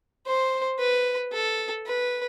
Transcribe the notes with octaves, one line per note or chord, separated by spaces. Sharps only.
C5
B4
A4
B4